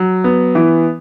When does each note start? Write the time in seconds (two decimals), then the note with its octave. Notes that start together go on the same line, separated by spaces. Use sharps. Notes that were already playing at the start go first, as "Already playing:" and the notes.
Already playing: F#3
0.24 B3
0.55 E3